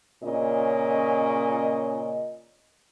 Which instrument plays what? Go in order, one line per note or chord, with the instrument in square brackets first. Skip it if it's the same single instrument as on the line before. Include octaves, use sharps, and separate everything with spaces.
[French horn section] A#2 C#3 C#4 D#5